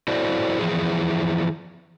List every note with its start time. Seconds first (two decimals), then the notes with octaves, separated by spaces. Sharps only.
0.08 E4 F#4 A4 C5 D5
0.59 E3 F3 E4 G#4